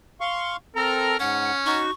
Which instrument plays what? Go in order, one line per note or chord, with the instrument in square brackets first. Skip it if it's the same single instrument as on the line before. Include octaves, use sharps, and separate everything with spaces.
[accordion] F5 C6 C#6
[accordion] C4 A4 A#5 [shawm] A#4
[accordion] G#2 [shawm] C#4 [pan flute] F#5
[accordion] D#4 F#4 [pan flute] C#6